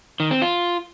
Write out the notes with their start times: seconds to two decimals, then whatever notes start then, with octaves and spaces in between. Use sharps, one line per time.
0.20 D#3
0.31 C4
0.42 F4